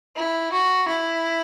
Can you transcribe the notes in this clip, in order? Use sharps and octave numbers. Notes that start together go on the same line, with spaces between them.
E4
F#4
E4